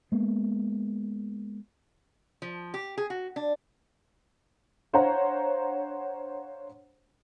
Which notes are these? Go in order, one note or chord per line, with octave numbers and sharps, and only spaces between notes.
G#3 A#3 B3
F3
G4
G#4
F#4
D4
D4 C5 C#5 F5 F#5 A#5